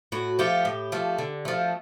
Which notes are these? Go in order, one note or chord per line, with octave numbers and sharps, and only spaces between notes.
A2 F#4
F3 A3 G4
A2
F3 A3
D3
F3 A3